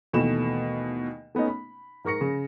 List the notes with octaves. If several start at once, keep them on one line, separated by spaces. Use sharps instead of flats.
D#2 B2 E3 A3 B5 E7
A3 B3 C#4 D#4
B5
G#2 A#4 C#6 A#6 C#7
C#3